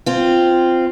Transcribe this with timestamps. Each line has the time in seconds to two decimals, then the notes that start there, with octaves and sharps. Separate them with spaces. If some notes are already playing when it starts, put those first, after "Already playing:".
0.06 C4 F4